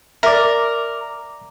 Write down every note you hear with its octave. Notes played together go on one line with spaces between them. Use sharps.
A#4 D5 E5 A#5 D6